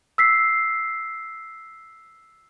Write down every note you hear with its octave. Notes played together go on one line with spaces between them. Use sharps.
E6 B6 C7